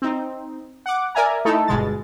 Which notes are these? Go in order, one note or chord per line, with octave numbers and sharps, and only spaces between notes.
C4 D#4
F#5 D6
A#4 D5 E5 G#5 A#5
A3 D#4 E4 A4
G1 B2 G#3 A6